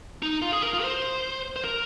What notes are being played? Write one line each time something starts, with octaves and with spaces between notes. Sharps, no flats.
D#4
F4
G#4
A#4
F4
C5
C5
A#4